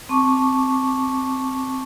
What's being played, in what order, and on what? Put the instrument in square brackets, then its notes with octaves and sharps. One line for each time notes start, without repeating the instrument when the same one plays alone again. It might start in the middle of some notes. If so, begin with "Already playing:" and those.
[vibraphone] C4 A5 C#6 D6